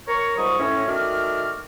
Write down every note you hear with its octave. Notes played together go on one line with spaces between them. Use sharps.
A#4 C#5 C#6
C#2 G#2 G3 C#6 D#6
A2 C#4
D#3 A3 F#4 D5 F6